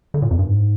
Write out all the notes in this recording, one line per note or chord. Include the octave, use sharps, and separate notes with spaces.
D3
A#2
F2
G2
G#2